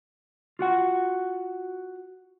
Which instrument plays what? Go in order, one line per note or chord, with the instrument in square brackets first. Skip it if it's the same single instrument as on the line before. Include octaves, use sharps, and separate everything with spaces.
[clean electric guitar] F4 F#4 F#5